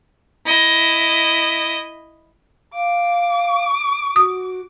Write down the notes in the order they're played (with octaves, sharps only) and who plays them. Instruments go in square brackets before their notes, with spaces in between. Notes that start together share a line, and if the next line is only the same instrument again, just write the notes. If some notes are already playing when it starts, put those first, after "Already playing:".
[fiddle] E4 D#5
[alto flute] F5 [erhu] D6
[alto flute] F#4 [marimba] D#6